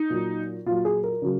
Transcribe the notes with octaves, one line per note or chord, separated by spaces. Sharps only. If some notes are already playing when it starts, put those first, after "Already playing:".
Already playing: D#4
A#2 F#3
A#2 F#3 F4
G#4
A#4
C#3 F#3